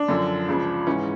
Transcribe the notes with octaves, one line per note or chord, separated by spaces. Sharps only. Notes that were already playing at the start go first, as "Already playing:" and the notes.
Already playing: D4
F#2 D3 F3
C#2 C#3 F3
G#2 E3 C#4